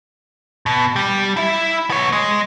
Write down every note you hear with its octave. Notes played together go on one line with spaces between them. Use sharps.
B2
G3
E4 E5
B3 C#5
G#3